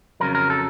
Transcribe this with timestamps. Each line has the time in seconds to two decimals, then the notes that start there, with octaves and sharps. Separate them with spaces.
0.20 F2 C#3 F#3 A#4
0.35 A#4
0.50 A4